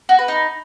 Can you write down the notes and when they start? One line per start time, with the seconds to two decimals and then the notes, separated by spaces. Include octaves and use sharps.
0.09 F#4
0.19 B4
0.28 D#4